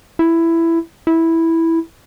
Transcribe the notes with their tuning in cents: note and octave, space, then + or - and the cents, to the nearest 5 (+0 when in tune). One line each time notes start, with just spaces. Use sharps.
E4 +10
E4 -5